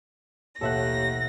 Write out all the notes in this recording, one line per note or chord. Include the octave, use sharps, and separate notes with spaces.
A1 D#2 B2 A4 E5 F#5 A#6 E7